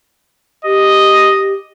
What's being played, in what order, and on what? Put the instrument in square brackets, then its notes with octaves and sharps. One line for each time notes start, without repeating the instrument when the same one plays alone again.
[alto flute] G4 [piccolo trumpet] D#5